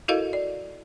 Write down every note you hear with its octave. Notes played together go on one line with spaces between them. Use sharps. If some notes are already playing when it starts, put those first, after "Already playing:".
E4 F#4 A4 A#4 D#5 F5
D5